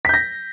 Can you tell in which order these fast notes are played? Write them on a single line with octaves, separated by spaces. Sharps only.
B6 G6 A#6